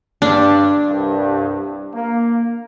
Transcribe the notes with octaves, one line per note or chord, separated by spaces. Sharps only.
G2 D4
C2 G2
A#3